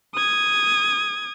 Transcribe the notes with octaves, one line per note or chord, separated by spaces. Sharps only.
D#6 G#6